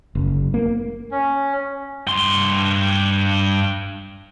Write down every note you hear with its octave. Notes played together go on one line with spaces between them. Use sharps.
F#1
A#3
C#4
G2 C6